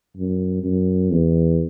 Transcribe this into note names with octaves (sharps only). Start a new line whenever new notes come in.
F#2
F#2
E2